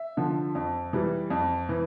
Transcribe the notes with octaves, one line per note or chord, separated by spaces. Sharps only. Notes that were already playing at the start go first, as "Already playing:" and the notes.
Already playing: E5
D3 F3
F2
E3 G3
F2
E3